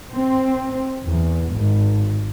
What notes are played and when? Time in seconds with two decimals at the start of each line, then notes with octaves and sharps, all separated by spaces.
0.14 C4
1.06 E2
1.53 G#1